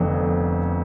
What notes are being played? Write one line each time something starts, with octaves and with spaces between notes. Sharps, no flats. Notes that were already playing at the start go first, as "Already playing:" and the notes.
Already playing: F1 F2 D3 B3